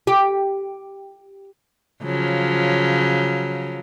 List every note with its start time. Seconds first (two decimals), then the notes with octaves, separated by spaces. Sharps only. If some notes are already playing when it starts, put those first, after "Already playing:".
0.07 G4
2.03 C#3 F3 F#3